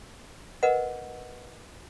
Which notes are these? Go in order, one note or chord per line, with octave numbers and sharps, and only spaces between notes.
A#4 B4 D#5 F#5